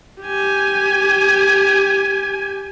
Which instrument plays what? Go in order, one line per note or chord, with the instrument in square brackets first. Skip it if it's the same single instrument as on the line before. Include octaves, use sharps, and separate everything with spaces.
[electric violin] G4 G#5